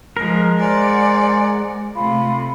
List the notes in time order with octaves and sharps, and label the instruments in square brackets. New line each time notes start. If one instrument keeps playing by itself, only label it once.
[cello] F3 [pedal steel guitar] G#3 A#4
[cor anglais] C5 [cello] D5 F#5 [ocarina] G#5
[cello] C3 A3 [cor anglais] F4 [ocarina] B5